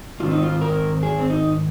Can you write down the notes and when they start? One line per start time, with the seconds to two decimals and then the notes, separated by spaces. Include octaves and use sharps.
0.20 G#2 D#3 C4 F4
0.31 D#4
0.43 F4
0.61 A#4
1.03 G#4
1.19 C4
1.30 D#4